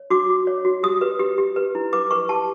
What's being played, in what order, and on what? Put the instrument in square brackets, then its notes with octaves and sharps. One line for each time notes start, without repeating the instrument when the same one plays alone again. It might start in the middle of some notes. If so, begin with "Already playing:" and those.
Already playing: [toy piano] C#5
F#4 D6
F#4
C#5
F#4
G4 D#6
B4
G4
G4
B4
E4
B4 D6
B4 C#6
G4 A5